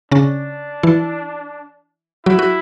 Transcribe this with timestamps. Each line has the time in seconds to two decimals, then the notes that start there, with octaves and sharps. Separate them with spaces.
0.12 C#3 C#4 D4
0.83 E3 E4
2.26 F#3 E4 F#4
2.39 F#4